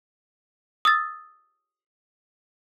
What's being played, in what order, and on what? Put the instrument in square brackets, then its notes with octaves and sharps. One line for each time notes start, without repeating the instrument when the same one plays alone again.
[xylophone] D#6 E6 A6